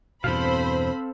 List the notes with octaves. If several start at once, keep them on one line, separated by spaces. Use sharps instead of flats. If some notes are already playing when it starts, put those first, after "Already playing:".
E2 G2 B2 C4 A4 C5 F5 B5